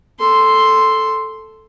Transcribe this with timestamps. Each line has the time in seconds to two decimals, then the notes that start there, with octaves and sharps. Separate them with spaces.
0.20 A4 C6